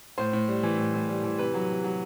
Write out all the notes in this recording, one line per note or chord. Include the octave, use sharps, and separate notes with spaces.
A2 C5
A2
G3
E3
A2
A2
G3
E3
C3 B4
F#3
C3
F#3